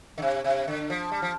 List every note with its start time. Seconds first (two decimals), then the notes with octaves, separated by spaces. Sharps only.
0.18 D3
0.22 C3
0.44 C3
0.68 D3
0.90 F3
1.12 G3
1.22 F3